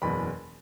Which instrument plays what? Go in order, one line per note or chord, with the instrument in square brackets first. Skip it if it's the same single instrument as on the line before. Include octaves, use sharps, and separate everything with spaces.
[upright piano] F#1 E2 B2 B5